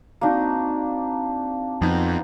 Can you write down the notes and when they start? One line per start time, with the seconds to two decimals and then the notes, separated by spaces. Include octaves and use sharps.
0.21 A#3 C4 D4 D#4 F#4
1.82 F2 B3 D#4 F4